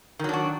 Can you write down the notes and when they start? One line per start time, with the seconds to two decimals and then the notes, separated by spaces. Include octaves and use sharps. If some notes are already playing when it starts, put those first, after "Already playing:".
0.19 D#3
0.24 F#3
0.29 D4
0.33 F#4